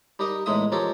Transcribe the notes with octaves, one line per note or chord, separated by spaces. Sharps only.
G3 D#4 G4 A#4 D#5
E2 A2 G#3 D#4 E5 D#6
F3 C#4 G4 A4 A#4